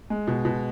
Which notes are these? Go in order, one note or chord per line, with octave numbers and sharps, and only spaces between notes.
G#3
B2
B2